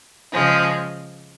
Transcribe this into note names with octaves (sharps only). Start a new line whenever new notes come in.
C#3 F3 G#3